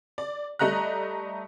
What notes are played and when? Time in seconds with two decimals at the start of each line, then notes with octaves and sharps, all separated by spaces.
0.18 D5
0.59 G3 A3 D#5 A#5 F#6